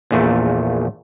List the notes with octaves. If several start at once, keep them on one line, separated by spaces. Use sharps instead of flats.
A#1 E2 A#2 A3